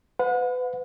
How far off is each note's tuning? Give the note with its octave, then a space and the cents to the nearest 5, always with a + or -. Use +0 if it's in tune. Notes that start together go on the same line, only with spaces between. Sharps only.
B4 +30 F#5 -40